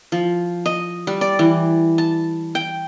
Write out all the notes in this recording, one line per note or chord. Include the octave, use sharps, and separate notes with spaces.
F3
D#5
G3
D5
E3
A5
G5